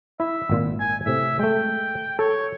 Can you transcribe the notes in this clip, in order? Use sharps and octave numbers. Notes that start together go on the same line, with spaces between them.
E4 E5
G#1 A#2 F4
G#5
A2 C3 E5
G#3 A3 G5
A4 C#5